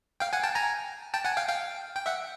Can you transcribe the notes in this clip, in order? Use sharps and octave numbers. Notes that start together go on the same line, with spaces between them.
F5 G5
F#5 G#5
G5 A5
G#5 A#5
G5 A5
F#5 G#5
F5 G5
F5 G5
G5
E5 F#5